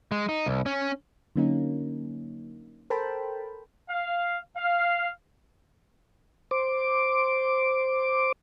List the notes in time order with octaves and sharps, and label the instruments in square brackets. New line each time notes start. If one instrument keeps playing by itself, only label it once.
[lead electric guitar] G#3
D#4
C2
C#4
[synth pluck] D3 F#3 A#3 C#4 D#4
A4 A#4 C5 G5 A5 B5
[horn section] F5
F5
[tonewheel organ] C5 D6